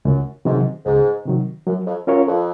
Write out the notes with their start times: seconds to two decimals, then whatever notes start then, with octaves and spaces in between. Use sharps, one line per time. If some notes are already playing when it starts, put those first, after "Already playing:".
0.05 C#2 F#2
0.45 G#2 C3 D#3 F#3
0.85 C#2 G#2
1.26 C3 D#3 F#3
1.66 F#2 F#3
1.87 F2
2.07 F#2 C#4 F4 A#4 C#5
2.27 F2